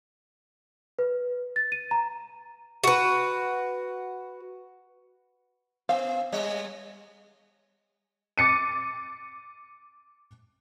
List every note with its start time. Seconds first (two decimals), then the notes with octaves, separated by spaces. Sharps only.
0.99 B4
1.56 A6
1.72 D#7
1.91 A#5
2.84 F#4 B4
5.89 B3 F5
6.32 G3 B3 C#5
8.38 D6 A6 C#7 D#7